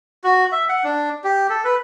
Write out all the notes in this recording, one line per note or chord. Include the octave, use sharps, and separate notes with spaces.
F#4
E5
F#5
D4
G4
A4
B4